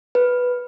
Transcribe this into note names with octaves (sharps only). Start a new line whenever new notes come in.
B4